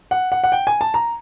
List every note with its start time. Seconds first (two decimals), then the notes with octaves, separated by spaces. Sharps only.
0.11 F#5
0.32 F#5
0.44 F#5
0.52 G5
0.67 G#5
0.81 A5
0.94 A#5